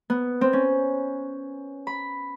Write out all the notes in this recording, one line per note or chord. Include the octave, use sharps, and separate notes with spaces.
B3
C4
C#4
B5